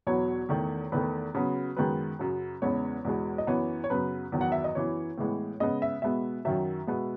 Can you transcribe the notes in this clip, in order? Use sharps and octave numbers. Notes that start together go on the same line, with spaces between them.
E2 B2 F#3 B3 C#5
E2 D#3 A3
E2 D#3 A3 B4
C#3 F#3 B3
F#2 D#3 G#3 B3 B4
F#2 C#3 F#3
E2 C#3 G#3 B3 C#5
E2 B2 G#3 B3
D#5
F#2 E3 B3 C#5
C#5
F#2 C#3 F#3 B3 B4
E2 D#3 F#3
F#5
E5
D#5
F#2 E3 B3 C#5
A2 E3 G#3 B3
C#3 G#3 B3 D#5
E5
B2 G#3 B3 E5
F#2 D#3 F#3 E5
B2 G#3 B3